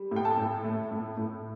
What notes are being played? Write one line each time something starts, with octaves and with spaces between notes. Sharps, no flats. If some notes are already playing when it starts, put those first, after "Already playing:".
Already playing: G3
A2
G5
A4 A5
A2
A3
A2
A2